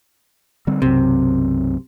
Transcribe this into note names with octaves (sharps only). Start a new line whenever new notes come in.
D3 G3 C4
B1 F#2 C3